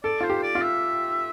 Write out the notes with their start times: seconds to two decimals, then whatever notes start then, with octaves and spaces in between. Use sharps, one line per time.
0.04 A4 D5
0.21 F4 C5
0.30 G4
0.43 D5
0.55 F4
0.61 E5